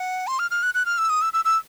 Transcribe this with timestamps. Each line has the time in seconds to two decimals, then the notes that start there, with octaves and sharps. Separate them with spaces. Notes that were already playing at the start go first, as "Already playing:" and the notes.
Already playing: F#5
0.27 C6
0.39 F6
0.51 F6
0.63 F#6
0.74 F#6
0.86 F6
0.98 E6
1.10 D#6
1.22 E6
1.33 E6
1.45 E6